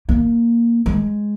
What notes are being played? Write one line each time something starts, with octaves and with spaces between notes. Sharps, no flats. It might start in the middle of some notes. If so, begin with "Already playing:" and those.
A#3
G#3